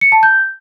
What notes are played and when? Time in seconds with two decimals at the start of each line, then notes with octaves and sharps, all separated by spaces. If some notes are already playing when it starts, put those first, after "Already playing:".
0.01 C#7
0.12 A5
0.23 G6